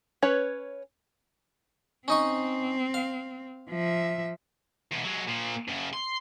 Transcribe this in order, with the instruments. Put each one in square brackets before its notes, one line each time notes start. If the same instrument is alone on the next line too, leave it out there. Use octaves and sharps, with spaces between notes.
[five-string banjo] C#4 B4 C#5
[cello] C4 [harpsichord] C#4 D#4 C#6
[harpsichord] F5
[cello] F3 E5
[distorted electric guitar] E2 B2
F#3 G#3
A#2 F3
F#2 C#3
C6